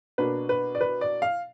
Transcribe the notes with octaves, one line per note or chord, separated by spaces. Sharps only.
B2 A#3 D4 B4
B4
D5
B4
D5
F5